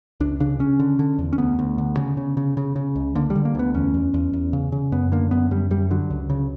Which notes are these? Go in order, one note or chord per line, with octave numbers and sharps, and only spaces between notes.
C#2 D4
C#3 D4
C#3 C#4
D3
D3
E2
C#4
D2 B3
D2
D3
C#3
C#3
C#3
C#3
C#3
C#2
D3 A#3
G3
D3
A#3
D2 B3
E2 C#4
E2
E2
E2
C#3
C#3
F#2 B3
D3 A#3
F#2 B3
F#2 G3
F#2 G3
D3 F#3
C#2
C#3